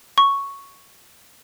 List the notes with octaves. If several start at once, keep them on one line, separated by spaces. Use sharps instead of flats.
C#6